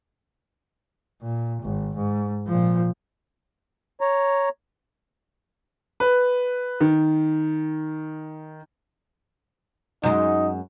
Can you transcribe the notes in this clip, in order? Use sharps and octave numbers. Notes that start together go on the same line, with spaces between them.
A#2
G#1
G#2
A#2 F3
C#5 A#5
B4
D#3
F#2 G#3 D#4